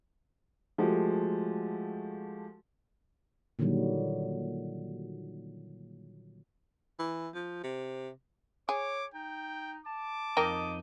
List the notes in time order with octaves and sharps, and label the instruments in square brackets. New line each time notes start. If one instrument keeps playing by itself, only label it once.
[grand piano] F3 G#3 A3 F#4 G4
[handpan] A#2 D3 D#3 F#3 G3
[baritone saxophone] E3
F3
C3
[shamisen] G#4 [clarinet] C#5 [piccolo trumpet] D6
[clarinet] D#4 [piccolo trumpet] G5
[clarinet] A5 [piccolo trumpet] D6
[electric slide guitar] F2 D#4 D#5 [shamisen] A#3 A#4 G5